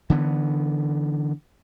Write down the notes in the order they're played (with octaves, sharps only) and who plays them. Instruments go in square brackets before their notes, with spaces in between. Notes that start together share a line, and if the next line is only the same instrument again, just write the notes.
[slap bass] D3 E3 B3